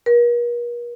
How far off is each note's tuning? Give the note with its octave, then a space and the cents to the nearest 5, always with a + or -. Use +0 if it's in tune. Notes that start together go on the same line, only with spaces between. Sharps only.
A#4 +45